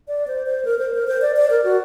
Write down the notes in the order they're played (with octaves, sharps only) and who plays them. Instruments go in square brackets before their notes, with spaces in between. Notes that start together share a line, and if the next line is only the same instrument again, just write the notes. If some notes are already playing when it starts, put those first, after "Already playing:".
[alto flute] D5
C5
C5
A#4
C5
A#4
C5
D5
D5
A#4
F#4